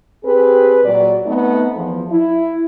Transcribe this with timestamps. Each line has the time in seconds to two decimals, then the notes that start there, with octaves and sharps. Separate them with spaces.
0.24 C4 G4 G#4 B4
0.84 A#2 F#3 D5
1.26 A3 B3 C4 D#4
1.75 E2 F3
2.10 E4